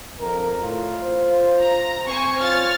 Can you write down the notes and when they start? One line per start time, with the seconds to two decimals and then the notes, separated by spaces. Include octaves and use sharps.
0.20 F2 A#4
0.61 A2 F4
1.03 C5
1.60 A#5
2.08 C4 C5 G#5 C#6
2.40 F4 C#5 F6 A6